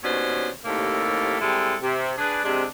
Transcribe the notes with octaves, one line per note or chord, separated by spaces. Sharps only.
D#2 B2 C#4 D4 C5 C#5
D#2 A2 C3 A#3 A4
G3 G#3 C4 E4 A4
C3
D4 G#4 B4
C3 G#3 D4